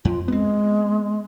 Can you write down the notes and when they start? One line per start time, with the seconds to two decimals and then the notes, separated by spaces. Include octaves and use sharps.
0.05 F2 F4
0.28 G#3 B3 C4